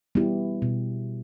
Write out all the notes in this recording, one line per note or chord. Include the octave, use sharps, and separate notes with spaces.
G3 B3 E4 G4
B2